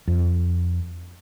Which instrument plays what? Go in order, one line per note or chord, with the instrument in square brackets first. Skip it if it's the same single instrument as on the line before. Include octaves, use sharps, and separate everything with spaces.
[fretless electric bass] F2